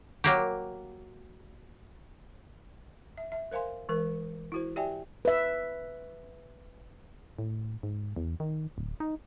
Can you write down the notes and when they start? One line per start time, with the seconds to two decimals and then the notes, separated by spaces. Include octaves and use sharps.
0.24 F#3 A#3 G4
3.18 E5
3.32 E5
3.51 A#4 C5 F5 G#5 C6
3.89 E3 G#3 A#4
4.52 E4 F#4 C5
4.76 G4 D5 E5 G5 G#5
5.25 B4 E5
7.39 A2
7.83 G#2
8.16 E2
8.40 D#3
8.78 D1
9.00 D#4